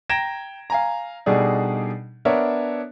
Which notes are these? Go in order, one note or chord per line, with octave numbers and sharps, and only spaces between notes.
G5 A#5 G#6 A#6 D7 E7
F5 G#5 A#5
B2 G3 D4 D#4 G#4 A4
B3 D4 A#4 C#5 E5